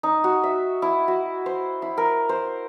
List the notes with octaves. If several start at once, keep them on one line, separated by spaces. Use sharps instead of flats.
D#4
F#4
E5
E4
F#4
C5
E4
A#4
C5